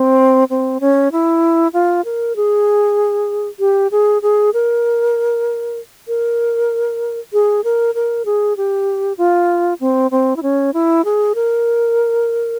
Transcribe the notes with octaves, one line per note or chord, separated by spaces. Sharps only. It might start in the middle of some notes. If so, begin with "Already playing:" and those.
Already playing: C4
C4
C#4
E4
F4
A#4
G#4
G4
G#4
G#4
A#4
A#4
G#4
A#4
A#4
G#4
G4
F4
C4
C4
E4
C#4
E4
G#4
A#4